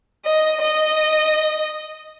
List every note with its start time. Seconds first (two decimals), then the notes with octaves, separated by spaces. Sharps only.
0.25 D#5
0.61 D#5